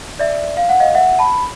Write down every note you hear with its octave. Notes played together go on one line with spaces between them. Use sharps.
D5 E5
F5
F#5
D#5 F5
E5 F#5
A5 B5